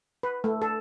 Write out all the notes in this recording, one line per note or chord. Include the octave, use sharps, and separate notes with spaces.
B4
A3
A4